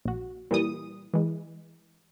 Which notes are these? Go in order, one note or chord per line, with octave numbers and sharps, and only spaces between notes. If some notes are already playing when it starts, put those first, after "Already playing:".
A#1 F#4
A#2 E3 G3 D#6
E3 G#3